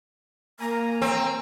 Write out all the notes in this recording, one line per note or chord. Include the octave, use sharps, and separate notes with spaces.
A#3 A#4 G#5 A#5
C4